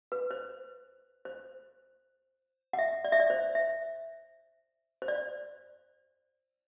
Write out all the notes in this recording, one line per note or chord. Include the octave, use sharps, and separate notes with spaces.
B4
C5
C5
F#5
E5
D5
E5
D5
C5
E5
C5
D5